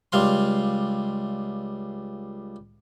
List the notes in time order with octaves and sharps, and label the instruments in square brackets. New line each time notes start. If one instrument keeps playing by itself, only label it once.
[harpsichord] C#2 G3 F5 C6